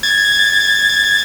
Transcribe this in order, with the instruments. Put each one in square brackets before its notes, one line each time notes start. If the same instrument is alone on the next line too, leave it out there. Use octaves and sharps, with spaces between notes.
[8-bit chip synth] G#6 A6